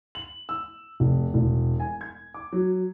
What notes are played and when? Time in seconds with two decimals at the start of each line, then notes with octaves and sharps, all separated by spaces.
0.15 F#7
0.49 E6
1.00 F1
1.34 E1
1.80 G#5
2.01 G#6
2.34 D6
2.53 F#3